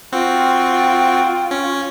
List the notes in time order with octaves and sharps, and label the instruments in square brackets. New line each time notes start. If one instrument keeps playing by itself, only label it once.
[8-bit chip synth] C4 [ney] F4 [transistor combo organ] F#4 [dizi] G5
[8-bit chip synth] C#4